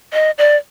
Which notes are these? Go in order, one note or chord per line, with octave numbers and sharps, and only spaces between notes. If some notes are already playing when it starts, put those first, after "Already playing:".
D#5
D5